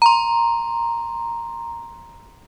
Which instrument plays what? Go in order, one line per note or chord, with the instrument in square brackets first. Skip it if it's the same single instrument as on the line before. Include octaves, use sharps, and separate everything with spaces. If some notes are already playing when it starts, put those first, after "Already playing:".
[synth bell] A#5 C6